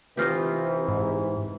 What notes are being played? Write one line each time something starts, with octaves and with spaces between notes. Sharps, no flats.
C3 E3 D#4 F4 G4
G#2